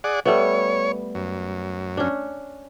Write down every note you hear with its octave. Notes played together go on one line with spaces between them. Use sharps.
G#4 D5 F#5
G3 A3 B3 C#5
F#2
C#4 D4